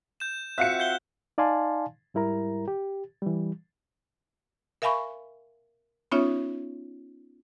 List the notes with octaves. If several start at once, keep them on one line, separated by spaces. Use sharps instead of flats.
G6 E7
C4 F4 F#4 E5 F5 F#6 C#7
G6 G7
D#4 D5 F5 G#5 A5 C6
G#2 G3 E4 A#4 A#5
G4
E3 G3
A#4 E5 F5 G#5 B5 C#6
B3 C#4 D#4 F4 C#5 E5